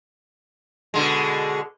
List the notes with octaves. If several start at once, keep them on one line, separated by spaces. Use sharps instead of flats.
B2 D3 G#3